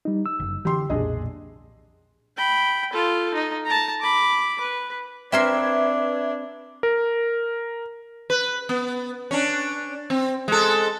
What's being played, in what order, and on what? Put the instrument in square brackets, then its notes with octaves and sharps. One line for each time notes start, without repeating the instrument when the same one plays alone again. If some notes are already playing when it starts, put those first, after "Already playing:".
[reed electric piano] G3 D#4
E6
[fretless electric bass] F#1
[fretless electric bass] D3 E3 F3 [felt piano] G4 C6
[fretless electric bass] B1 F2 A#2 [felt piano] D4 G#4 D#5
[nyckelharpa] G5 B5
F4 A4
D#4
A5 A#5
B5 D6
B4
[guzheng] C4 A#4 C6 [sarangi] D4 [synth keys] B4 E5 G#6
[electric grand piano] A#4
[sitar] B4
B3
C#4 D4
C4
G#3 A4